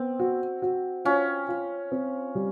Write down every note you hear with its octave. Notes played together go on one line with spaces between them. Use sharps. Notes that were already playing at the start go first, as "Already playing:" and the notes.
Already playing: B3 C4
F#4
F#4
C#4 F4
F4
C4
G3